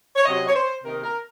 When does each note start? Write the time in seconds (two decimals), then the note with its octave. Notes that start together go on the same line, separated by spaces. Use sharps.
0.16 C#5
0.26 C3 F#3 C#4 D#5
0.48 C#5
0.55 C5
0.84 C3 D#3 A#3 D#4 A#4
1.03 A#4